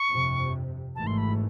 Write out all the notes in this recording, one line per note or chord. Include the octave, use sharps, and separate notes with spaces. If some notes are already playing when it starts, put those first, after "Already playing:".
Already playing: C#6
G1 F2 C3
G#1 G#2 E3 A3 A5
C6
B5